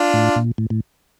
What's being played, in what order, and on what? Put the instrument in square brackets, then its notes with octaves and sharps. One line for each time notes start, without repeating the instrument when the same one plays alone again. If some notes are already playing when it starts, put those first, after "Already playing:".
Already playing: [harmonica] D4 F4
[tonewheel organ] A2
A#2
A2
A2